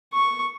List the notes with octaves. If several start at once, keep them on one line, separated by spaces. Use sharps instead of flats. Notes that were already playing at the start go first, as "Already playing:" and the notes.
C#6